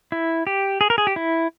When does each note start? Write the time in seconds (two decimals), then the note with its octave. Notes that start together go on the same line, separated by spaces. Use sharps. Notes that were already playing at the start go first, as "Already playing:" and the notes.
0.12 E4
0.47 G4
0.81 G#4
0.90 A#4
0.98 G#4
1.07 G4
1.16 E4